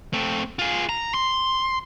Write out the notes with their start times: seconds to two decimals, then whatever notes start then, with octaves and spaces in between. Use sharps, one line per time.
0.13 A3 C4
0.59 F4 G#4
0.89 A#5
1.14 C6